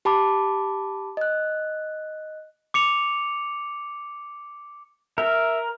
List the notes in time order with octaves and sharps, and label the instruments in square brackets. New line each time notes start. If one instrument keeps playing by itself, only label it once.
[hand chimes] G4 A5 B5 D6
D#5 F#6
[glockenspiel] D6 C#7 F7
[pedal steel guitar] A#4 [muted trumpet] E5